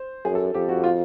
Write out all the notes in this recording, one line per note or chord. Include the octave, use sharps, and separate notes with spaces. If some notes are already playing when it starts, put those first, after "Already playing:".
Already playing: C5
F#2 G#4
A4
F2 G4
F#4
F4